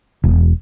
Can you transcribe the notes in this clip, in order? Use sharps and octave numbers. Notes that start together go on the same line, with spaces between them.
E1